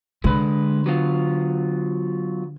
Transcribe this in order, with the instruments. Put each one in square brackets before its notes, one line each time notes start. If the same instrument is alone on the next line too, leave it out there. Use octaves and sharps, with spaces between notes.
[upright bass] D3 [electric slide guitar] G#3 B4
[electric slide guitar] F#3 B3 F4